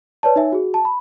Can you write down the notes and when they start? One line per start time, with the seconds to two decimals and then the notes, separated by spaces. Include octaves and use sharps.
0.23 B4 C#5 D5 A5
0.36 D#4 C#5 E5 G#5
0.52 F#4 G#4
0.74 A5
0.85 B5